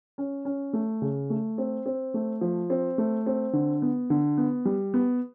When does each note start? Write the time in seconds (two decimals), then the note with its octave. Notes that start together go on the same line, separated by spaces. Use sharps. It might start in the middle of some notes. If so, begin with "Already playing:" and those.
0.18 C#4
0.45 C#4
0.73 A3
1.02 C#3
1.30 A3
1.58 C4
1.86 C4
2.14 A3
2.41 F3
2.70 C4
2.98 A3
3.26 C4
3.53 D3
3.82 B3
4.10 D3
4.38 B3
4.65 G3
4.94 B3